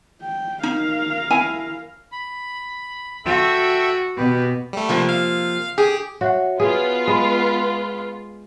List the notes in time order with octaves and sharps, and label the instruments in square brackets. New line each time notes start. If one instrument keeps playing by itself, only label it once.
[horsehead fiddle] G5
[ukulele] D#4 [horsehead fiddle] A#4 F5
[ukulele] E4 G#5
[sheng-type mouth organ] B5
[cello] F#4 [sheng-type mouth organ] A4 E5 G5
[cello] B2 [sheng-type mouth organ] G4 B4
[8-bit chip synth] G3 A3
[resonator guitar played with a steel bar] C3 F3 A#3
[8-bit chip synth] F5
[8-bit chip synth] G4 [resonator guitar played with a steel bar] G#4
[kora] F#4 [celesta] C#5 E5 F#5
[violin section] B3 F4 [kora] G#4
[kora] G#3 [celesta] B4 B5